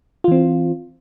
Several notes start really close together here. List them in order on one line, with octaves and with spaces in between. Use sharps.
F4 E3 C4